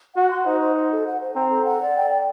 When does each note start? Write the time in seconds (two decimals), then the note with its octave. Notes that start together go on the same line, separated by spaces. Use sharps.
0.16 F#4 F#5
0.31 C6
0.46 D#4 C5
0.61 C5
0.75 C5
0.91 A4
1.06 F#5
1.21 C5
1.35 C4 A#5
1.50 A4
1.65 F#5
1.81 D5
1.96 G5
2.11 G5